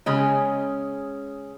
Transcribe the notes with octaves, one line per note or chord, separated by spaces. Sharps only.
C#3 G#3 C#4 G#4